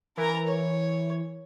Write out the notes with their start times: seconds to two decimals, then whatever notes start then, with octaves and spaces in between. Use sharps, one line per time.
0.17 E3 A#4 A#5
0.47 C#5